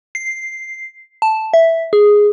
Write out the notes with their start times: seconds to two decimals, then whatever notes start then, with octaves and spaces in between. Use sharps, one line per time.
0.15 C7
1.22 A5
1.54 E5
1.93 G#4